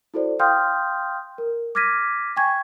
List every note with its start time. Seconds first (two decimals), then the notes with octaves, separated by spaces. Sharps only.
0.14 E4 F#4 A4 C5 D5
0.39 F5 G5 C6 D#6 F6 G6
1.38 A#4
1.75 D6 F6 G#6 A#6 B6 D#7
2.36 G5 G#5 C#6 G#6